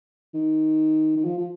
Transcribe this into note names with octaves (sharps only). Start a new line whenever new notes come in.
D#3
D#3
F3
F3